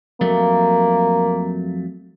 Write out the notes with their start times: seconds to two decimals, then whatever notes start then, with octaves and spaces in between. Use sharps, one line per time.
0.21 F2 F#3 A3 A#3